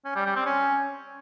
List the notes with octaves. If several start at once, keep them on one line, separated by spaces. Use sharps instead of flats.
C#4
G3
G3
C4
C#4